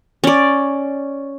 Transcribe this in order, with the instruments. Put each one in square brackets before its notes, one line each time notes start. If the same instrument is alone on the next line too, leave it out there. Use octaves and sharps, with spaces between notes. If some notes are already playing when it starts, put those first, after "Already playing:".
[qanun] C#4 D5